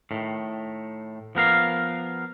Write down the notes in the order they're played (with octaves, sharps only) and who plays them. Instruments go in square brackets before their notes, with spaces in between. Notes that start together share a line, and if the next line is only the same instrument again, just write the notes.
[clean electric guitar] A2 D#3
F3 B3 A#4 F5